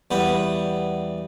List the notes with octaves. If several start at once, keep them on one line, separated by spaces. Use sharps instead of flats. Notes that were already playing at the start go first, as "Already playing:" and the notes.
E2 G3 B3